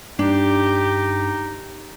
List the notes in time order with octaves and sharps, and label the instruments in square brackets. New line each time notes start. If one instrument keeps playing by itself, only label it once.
[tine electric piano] G2 [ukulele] D4 [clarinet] D#4 [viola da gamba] G4